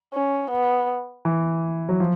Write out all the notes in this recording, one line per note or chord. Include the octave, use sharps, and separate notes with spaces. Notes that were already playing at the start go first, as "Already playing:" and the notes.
C#4
B3
E3
F#3
F3